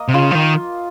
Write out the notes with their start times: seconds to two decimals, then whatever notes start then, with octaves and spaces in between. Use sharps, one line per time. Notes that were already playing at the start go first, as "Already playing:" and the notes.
Already playing: A#3 D#5
0.08 C3
0.14 C#3 F4
0.31 F3
0.35 D#3